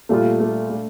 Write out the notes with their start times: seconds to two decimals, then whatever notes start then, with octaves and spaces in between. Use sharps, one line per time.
0.09 A#2 G3 A3 A#3 F4
0.40 A3
0.70 A3